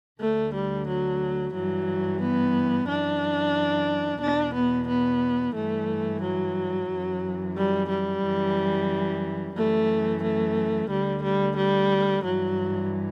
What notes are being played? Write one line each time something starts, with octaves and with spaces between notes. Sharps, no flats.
D2 D3 A3
G3
F#3
G2 E3 F#3
B3
F#2 E3 D4
E2 B2 D4
B3
B3
G2 E3 A3
F#3
F#2 E3
G3
G3
F#2 E3
F#2 E3 A3
A3
D2 D3 G3
G3
G3
G2 E3 F#3